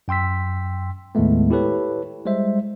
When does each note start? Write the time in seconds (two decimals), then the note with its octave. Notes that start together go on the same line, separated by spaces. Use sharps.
0.08 F#2 G5 C6 E6 B6
1.15 D#2 A2 D#3 G#3 A3 B3
1.51 E4 G4 A4 B4 C#5
2.25 G3 G#3 C5 E5